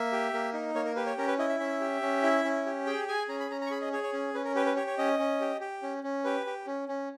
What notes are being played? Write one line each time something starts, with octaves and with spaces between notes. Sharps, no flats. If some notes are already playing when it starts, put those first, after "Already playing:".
Already playing: A#3 E5
G4
A#3
D#4
A#3 C#5
A#4
G4 B4
C#5
C#4 A#4
B4
E4 D#5
E5
C#4 E5
G4
C#4
E4
C#4
G4
G#4 G5
G#4 G#5
C#4 A#5
B5
C#4 A#5
A#5
C#6
G#4 B5
D#5
G#4 C#5
C#5
C#4
C#4 B4
A#4
G4 B4
B4
G4 C#5
C#5
C#4 D#5
C#4
G4
G4
C#4
C#4
G4 B4
G4
C#4
C#4